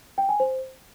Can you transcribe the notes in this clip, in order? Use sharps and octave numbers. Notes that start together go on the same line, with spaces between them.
G5
G#5
C5